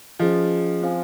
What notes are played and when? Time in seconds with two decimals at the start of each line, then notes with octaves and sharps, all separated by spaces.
0.20 F3 C#4 G#4 D#5
0.82 C4 F4 C5 F5 G#5